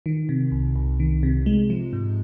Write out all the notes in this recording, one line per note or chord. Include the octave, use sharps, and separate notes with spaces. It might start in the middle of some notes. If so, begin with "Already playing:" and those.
D#3
C3
C2
C2
D#3
C3
G#3
F3
G#2